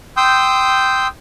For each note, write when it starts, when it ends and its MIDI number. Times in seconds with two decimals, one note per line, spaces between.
0.17 1.07 79
0.17 1.07 84
0.17 1.07 87
0.17 1.07 88
0.17 1.07 91